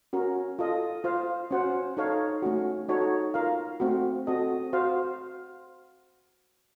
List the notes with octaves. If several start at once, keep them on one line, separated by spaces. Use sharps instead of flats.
C#4 F#4 A#4
F4 A4 D#5
F4 C5 F5
C#4 F#4 C5 F#5
D#4 A4 C#5 F5
A3 C#4 F#4
D#4 F#4 A4 C#5
F4 A#4 F5
A3 C4 F#4
C4 F#4 A4 D#5
F#4 C5 F5